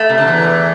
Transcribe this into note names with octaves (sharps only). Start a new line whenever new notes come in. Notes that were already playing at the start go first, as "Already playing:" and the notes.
Already playing: A3
C3
D3
E2 E3